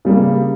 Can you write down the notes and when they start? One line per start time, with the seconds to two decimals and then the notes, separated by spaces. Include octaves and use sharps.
0.05 C#3 G3 A#3